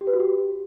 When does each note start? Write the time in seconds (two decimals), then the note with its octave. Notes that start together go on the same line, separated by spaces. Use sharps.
0.01 G4
0.07 B4
0.13 F#4
0.20 G4